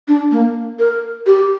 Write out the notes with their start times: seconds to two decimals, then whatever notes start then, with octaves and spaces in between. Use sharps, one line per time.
0.08 D4
0.31 A#3
0.79 A#4
1.26 G4